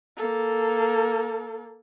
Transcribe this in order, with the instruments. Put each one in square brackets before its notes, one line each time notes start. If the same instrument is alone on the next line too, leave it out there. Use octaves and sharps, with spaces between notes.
[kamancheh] A#3 A4